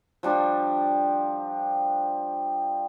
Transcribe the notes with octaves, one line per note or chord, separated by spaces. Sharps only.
F3 G3 D4